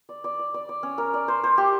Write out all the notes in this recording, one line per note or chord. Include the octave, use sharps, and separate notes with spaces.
D5
D5
D5
D5
D5
C#4
A#4
D5
C5
C5
G4